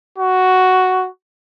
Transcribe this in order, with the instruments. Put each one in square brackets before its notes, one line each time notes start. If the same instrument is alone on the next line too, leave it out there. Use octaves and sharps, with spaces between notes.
[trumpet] F#4